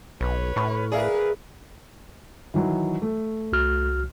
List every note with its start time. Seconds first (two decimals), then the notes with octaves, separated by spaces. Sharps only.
0.21 B1 B4 C#5
0.56 A2 B5 C#6 F6
0.92 G#4 A#4 B4 D5 E5 F5
2.54 D#3 E3 F#3
3.02 A3
3.52 C2 F#4 F6